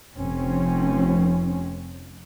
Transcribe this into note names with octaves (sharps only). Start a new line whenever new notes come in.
F1 F3 C4 C#4